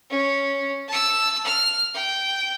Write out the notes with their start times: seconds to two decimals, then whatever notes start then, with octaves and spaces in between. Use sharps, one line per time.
0.10 C#4
0.88 A5 E6
1.45 F6
1.94 G5